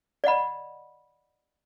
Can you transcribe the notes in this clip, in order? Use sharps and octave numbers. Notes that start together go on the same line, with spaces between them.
D5 D#5 F#5 B5